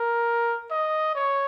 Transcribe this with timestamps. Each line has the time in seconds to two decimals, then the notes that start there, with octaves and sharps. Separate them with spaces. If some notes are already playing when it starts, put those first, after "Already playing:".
Already playing: A#4
0.71 D#5
1.15 C#5